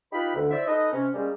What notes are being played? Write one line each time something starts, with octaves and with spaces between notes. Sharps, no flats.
D#4 F4 G4 B4 B5
D2 D3
E4 C5 D5 E5
D#4 A4 B4 D#5
C3 C#4
G3 G#3 A#3 C#4